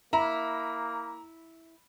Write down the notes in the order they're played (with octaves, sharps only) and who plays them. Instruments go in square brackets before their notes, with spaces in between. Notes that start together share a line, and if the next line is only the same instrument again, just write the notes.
[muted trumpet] A#3 [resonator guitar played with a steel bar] E4 [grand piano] A#5